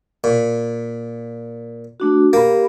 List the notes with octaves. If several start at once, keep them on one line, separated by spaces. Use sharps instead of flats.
A#2
A3 D4 F#4
A#3 G4 B5